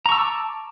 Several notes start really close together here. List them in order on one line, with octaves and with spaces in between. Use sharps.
A#5 C#6 E6 A5 D6